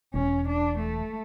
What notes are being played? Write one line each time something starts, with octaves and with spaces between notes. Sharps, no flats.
E1 C#4
D4
A3